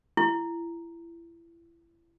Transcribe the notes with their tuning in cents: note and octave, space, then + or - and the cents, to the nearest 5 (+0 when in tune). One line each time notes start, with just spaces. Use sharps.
E4 +30